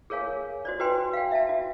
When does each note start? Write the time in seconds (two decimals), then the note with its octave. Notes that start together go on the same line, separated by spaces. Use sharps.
0.10 G#4 A#4 C#5 F5 G#5
0.65 F#4 C5 D5
0.80 F#4 B4 C5 G5 G#5 C6
1.13 F5 G5
1.32 E5 F5 A5
1.49 F#4